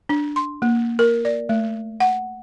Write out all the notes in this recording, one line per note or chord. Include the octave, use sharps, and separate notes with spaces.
D4
C6
A#3
A#4
D5
A3
F#5